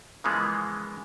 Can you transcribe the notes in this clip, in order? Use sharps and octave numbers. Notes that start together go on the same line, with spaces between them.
C#3 E3 F3 G#3 A#3 B3